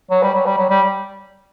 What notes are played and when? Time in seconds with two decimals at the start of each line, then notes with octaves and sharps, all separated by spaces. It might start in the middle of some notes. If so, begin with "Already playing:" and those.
0.11 F#3
0.22 G3
0.34 F#3
0.46 G3
0.58 F#3
0.70 G3